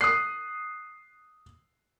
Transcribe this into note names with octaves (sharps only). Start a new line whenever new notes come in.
D#6 F#6 C7